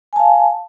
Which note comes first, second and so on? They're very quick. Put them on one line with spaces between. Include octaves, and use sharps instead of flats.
G#5 A5 F5